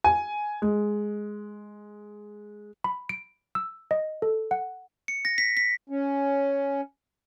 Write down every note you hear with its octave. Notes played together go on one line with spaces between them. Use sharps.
G#5
G#3
B5
D7
E6
D#5
A4
F#5
C#7
A#6
B6
B6
C#4